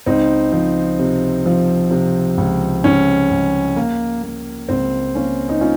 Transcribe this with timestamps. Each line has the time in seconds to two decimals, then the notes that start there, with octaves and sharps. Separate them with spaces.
0.06 C#2 C4 D#4
0.52 F3
0.99 C3
1.46 F3
1.91 C3
2.38 C#2
2.84 C#2 C#4
3.31 C#2
3.76 A#3
4.23 A#3
4.69 C#2 C4
5.15 A#3 C#4
5.49 D#4
5.61 A#3 C#4 F4